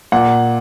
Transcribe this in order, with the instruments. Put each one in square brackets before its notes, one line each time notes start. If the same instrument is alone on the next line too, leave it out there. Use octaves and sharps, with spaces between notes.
[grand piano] A#2 F#5